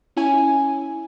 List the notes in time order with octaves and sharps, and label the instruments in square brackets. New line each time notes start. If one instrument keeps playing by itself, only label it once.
[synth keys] C#4 E4 G#5